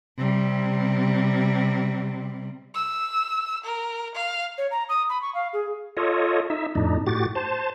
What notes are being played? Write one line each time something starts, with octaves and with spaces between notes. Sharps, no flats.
C3 G3
E6
A#4
F5
C#5
A#5
D#6
B5
C#6
F5
G#4
F4 A4 C#5 D#5
D#4 E5
F2 A2 D4 D#4
A2 F#4 G4 A6
C5 A5